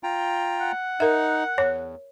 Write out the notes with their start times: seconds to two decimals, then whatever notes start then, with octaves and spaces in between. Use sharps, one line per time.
0.03 F4 G5 A#5
0.60 F#5
1.00 D#4 A#4 E5
1.58 E2 C#5